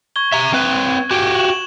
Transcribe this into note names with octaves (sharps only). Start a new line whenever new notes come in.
C#6 G#6 G7
E5 A#5
C4 B4
F#4 G4
E7 F#7